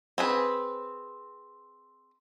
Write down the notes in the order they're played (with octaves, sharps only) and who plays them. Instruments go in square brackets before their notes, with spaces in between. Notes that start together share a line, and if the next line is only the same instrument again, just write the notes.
[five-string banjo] C4 G#4 B4